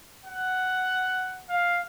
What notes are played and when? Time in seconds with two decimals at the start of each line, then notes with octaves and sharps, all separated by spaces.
0.25 F#5
1.49 F5